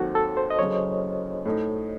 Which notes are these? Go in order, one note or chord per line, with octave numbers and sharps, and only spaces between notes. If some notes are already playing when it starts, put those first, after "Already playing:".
Already playing: D#2 D#3 F#3 C4 F#4 A4
A4
C5
D#5
F#1 F#2 C#3 C#5
A2 A3 D#4